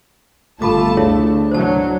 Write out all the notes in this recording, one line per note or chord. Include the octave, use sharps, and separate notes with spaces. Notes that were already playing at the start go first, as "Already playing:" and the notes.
G1 A3 F4 A4 A5 B5 D6
D2 D4 E4 G#4 C#5
F#3 C5 A5